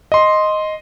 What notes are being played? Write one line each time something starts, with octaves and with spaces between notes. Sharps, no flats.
D#5 C6